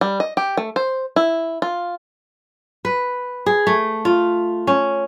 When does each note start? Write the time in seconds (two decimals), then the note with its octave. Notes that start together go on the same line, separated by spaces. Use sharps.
0.01 G3
0.20 D#5
0.37 G4
0.57 A3
0.76 C5
1.16 E4
1.62 F4
2.85 B4
3.46 G#4
3.67 A3
4.05 F4
4.67 C#4